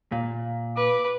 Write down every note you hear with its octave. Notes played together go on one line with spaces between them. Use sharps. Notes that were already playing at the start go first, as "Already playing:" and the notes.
A#2
B4 D6